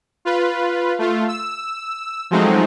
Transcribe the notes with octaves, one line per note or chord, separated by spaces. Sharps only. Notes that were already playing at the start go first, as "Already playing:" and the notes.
F4 B4
A3 F4
E6
F3 F#3 G#3 A3 C4 D#4